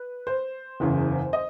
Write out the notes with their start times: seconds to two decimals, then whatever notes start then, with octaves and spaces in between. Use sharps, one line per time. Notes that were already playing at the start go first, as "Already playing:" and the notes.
Already playing: B4
0.27 C5
0.80 F#1 E2 C#3
1.33 D#5